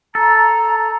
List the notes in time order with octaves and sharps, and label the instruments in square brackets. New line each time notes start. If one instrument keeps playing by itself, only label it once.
[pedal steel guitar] A4 [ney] A#5